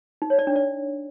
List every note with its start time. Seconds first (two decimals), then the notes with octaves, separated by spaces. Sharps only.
0.22 D#4
0.30 C#5
0.39 D5
0.47 D4
0.55 D5